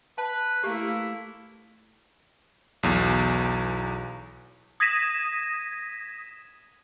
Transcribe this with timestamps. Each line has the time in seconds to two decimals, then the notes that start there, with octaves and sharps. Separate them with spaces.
0.18 B4 A5
0.63 A3 A#3 E4 G4
2.83 B1 E2
4.80 D#6 G#6 A#6 B6 D#7 E7